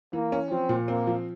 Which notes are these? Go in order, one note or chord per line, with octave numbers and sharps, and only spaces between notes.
E3 A#3
C#4
F3 C4
A#2
A#3 C4
F3